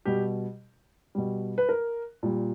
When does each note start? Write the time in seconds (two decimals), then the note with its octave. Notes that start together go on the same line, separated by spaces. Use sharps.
0.05 B2 G3 G4
1.15 B2 G3
1.58 B4
1.69 A#4
2.23 A#2 G3